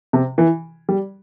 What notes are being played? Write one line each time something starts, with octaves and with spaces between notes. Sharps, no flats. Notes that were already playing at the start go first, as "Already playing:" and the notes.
C3
E3
G3